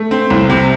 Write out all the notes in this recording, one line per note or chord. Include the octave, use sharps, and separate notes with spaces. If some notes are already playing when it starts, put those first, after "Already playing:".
Already playing: A3
C4
C2
C3